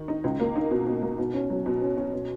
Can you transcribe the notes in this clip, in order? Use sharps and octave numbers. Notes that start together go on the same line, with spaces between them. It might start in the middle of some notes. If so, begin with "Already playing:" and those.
Already playing: D#3
D#4
C#2
A#3
D#4
B2
B2
A#3
B2
C#4
F#3
B2
C#4
C#4
B2